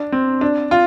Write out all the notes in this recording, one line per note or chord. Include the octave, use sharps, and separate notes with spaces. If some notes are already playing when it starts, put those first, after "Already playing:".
Already playing: D4
C4
D4
F4